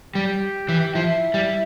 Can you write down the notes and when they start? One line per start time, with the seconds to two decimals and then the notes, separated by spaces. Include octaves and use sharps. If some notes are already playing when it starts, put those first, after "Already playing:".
0.15 G3 G4
0.69 E3
0.94 F3 E4
1.34 G3